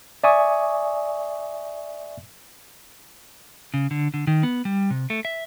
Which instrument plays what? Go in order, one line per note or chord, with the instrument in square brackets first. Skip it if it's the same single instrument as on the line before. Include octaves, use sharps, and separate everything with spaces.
[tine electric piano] D5 E5 G#5 C#6 D#6
[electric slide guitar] C#3
D3
D3
D#3
B3
G3
C3
A3
E5